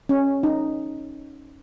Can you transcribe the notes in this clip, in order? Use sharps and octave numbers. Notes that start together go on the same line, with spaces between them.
C#4
D#4